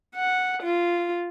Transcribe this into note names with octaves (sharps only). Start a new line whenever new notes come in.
F#5
F4